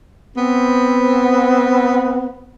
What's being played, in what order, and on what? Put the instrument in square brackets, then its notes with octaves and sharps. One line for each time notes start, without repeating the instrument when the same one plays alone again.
[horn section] B3 C4